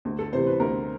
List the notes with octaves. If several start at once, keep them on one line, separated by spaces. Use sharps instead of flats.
D2
A4
C3 E3 C5
B4
D2 A#4